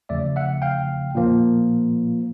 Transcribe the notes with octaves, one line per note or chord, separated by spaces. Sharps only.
E2 C#3 F3 A3 D5 E5
E5 F#5
F5 G5
A#2 F3 A#3